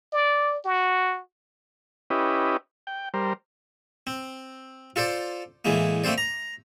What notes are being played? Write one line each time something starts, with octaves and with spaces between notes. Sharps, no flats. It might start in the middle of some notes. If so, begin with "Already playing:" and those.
D5
F#4
C#4 E4 G4 B4 D#5
G5
G3 A#4 C5
C4
F4 A4 C5 D5
A2 E3 G#3 A#3
A3 A#3 C4 C5 D5
A#5